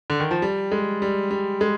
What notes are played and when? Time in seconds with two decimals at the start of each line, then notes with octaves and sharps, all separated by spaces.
0.10 D3
0.20 D#3
0.31 F3
0.42 G3
0.72 G#3
1.02 G3
1.31 G3
1.61 G#3